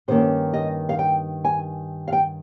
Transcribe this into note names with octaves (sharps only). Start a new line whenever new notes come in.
G2 D#3 A#3 C#4 C5
D#5
F5
G5
G#5
F5
G5